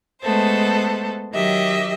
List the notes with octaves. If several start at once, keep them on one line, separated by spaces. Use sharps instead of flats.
G#3 A3 B3 A4 C5
D#3 F#3 G4 D#5 E5